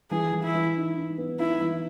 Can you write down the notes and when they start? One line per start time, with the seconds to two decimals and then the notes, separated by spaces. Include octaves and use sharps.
0.11 E3 G#4
0.33 E3
0.43 E4
0.54 E3
0.76 D#4
0.97 D#4
1.18 B3
1.39 D#4 E4
1.61 E3